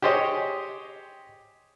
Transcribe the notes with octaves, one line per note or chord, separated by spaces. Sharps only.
G4 G#4 C5 C#5 D#5